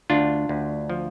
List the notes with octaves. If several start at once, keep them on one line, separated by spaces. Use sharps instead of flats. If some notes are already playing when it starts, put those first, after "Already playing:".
D2 D4 F4
D2
F3